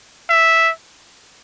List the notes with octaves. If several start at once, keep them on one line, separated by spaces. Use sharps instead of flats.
E5